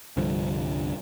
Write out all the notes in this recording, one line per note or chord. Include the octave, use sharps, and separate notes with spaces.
C2 G2 D3 F3